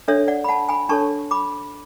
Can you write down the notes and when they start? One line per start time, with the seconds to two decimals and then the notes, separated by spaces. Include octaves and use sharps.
0.08 D4 A4 C#5 E5
0.28 D5 F#5
0.44 B5
0.48 F#5 A5
0.69 G#5 B5
0.89 D4 A4 C#5 A5 C#6
1.31 B5 D6